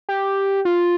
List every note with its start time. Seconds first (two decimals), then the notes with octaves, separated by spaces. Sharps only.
0.09 G4
0.65 F4